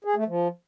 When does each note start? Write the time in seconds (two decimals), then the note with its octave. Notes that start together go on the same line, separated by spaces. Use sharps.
0.04 G#4
0.16 A3
0.27 F3